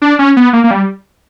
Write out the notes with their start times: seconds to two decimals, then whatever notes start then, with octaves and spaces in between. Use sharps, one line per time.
0.02 D4
0.19 C#4
0.37 B3
0.53 A#3
0.64 A#3
0.71 G3